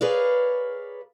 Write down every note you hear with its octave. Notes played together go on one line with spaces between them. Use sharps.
G#4 A#4 B4 C#5 D5 F5